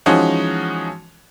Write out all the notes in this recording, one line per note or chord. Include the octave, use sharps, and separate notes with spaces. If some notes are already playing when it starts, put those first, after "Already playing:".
E3 F3 G#3 C#4 D#4 F#4